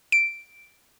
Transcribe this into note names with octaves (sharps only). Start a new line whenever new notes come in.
D7